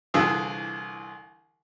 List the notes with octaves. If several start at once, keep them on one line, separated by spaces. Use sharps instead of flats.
C2 D3 E3 F4 G#4 E6